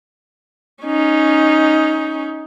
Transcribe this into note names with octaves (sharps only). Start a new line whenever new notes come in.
C#4 D#4